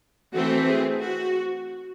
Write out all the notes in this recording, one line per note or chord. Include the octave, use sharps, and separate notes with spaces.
E3 A3 C4 F#4
G#4
F#4